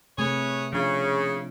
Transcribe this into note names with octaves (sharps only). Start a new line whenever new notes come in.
C3 A3 G#4 B4 C#5
C#3 F3 D4